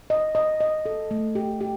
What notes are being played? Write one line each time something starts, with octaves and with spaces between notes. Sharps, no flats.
D#5
D#5
D#5
A4
A3
G4
G4